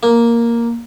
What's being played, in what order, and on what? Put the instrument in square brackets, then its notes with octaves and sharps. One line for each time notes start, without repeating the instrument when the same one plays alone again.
[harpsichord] A#3